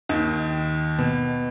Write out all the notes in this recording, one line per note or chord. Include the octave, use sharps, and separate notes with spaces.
D#2 D#3
B2